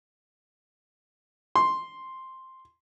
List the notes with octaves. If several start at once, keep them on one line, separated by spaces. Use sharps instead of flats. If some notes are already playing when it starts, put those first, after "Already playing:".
C6